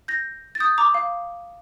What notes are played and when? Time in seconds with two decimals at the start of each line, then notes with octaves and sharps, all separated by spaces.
0.08 G6 A#6
0.55 A6
0.60 D#6 G6
0.78 A#5 D6
0.94 F5